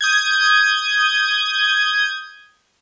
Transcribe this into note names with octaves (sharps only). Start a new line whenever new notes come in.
D#6 G6 G#6